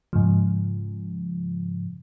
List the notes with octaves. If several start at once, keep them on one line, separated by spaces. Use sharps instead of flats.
G#2 C#3 F3